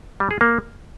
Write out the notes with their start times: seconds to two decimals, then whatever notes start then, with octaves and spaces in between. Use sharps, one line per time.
0.20 G3
0.31 G#4
0.41 A#3